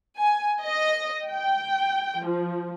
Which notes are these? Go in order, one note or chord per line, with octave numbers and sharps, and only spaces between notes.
G#5
D#5
G5
F3